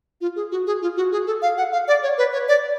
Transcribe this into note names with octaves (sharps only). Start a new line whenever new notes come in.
F4
G#4
F#4
G#4
F4
F#4
G#4
A4
F5
F#5
F5
D5
C#5
B4
C#5
D5